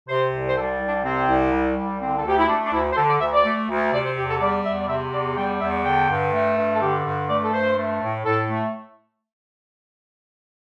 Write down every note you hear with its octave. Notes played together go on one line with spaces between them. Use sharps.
C3 C5
C2
C5
G3 A4
C2
D4
C3 C4
C2
G3
C2
D3 C4
A4
D2 G4
E4
A3 D4
D4
D2 E4
C5
D3 A4
D5
D2 E5
D5
A3
D2
C3 D5
C5
E2 G4
A4
G3 D5
E2 E5
D5
C3 E5
E2 D5
G3 G5
E2 E5
D3 G5
G2
A3
G2
A4
D3 G4
G2
A3 D5
A4
G2 C5
A3
A2
A2 A4
A3